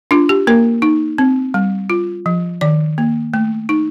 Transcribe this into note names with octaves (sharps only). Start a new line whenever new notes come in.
D4 F4
G4
A#3 A#4
D#4
C4
G3
F4
F3
D#3 D5
A#3
A3
D#4